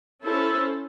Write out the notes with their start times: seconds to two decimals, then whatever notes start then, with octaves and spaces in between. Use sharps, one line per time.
0.24 C#4 E4 A4 C5